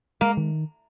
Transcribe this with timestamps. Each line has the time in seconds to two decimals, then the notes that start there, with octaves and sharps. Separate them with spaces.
0.21 G#3 A#3
0.37 D#3